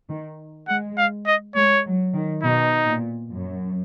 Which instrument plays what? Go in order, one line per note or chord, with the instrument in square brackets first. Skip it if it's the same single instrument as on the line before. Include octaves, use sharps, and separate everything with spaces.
[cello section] D#3
[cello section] G#3 [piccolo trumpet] F#5
[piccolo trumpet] F5
D#5
[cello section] G#3 [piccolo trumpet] C#5
[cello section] F#3
D#3
[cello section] B2 [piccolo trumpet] D#4
[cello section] A#2
F#2